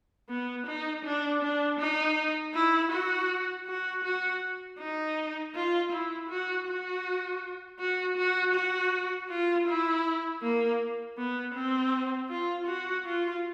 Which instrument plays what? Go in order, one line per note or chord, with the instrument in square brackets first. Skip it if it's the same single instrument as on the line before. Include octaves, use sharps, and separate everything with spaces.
[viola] B3
D#4
D4
D4
D#4
E4
F#4
F#4
F#4
D#4
F4
E4
F#4
F#4
F#4
F#4
F#4
F4
E4
A#3
B3
C4
F4
F#4
F4